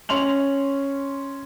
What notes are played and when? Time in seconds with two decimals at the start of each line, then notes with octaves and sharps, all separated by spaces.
0.09 C#4 C6 F7 F#7